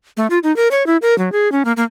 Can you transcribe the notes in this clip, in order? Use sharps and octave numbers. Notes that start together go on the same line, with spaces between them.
A3
F4
D#4
A#4
C#5
E4
A#4
F#3
G#4
C#4
A#3
A#3